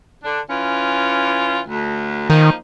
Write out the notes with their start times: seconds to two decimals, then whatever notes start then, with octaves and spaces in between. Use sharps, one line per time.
0.24 D3 D4
0.49 E3 C#4 F4
1.68 D2
2.30 D#3 F3 A#3 D#4